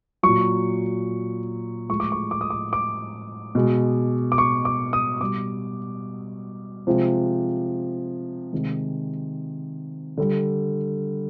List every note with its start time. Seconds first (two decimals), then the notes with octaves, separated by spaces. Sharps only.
0.23 A#2 F#3 C#6
1.89 A2 F3 G#3 C#6
2.00 D6
2.12 C#6
2.31 D6
2.41 D#6
2.50 D6
2.73 D6
3.55 B2 G#3
4.32 D6
4.38 C#6
4.65 D6
4.93 D#6
5.20 B2 G3 D6
6.87 C3 F3 G#3
8.52 C3 D#3 G#3
10.18 D3 G3